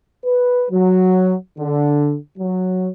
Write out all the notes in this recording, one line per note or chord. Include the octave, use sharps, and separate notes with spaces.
B4
F#3
D3
F#3